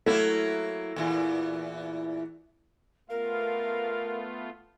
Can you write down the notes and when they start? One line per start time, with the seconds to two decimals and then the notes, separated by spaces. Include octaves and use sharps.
0.06 F#3 A3 A#3 E4
0.96 E2 A#2 E3
3.09 A3 B3 F4 A#4 F5